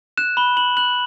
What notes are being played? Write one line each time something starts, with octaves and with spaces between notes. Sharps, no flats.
F#6 E7
B5 G7
B5 F#7
F#6 F#7